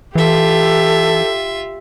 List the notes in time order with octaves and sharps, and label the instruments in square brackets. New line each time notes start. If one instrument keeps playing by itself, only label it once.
[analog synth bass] E3 [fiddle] F4 E5 [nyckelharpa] G4 [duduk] A4